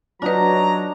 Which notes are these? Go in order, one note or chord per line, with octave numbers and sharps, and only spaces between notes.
F#3 D4 D#4 F4 B4 A#5